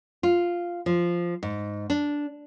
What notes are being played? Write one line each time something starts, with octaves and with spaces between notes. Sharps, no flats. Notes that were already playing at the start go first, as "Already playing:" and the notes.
F4
F3
G#2
D4